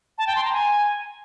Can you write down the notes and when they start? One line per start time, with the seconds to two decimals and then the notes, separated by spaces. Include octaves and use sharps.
0.18 A5
0.27 G5
0.36 C6
0.44 A#5
0.53 G#5